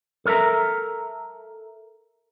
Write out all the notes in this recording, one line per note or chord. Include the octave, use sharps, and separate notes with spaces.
A4 A#4 D5 E5 A#5